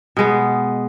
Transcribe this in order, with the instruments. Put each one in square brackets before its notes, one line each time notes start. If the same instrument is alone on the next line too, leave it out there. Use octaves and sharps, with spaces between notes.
[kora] B2 G#3 B3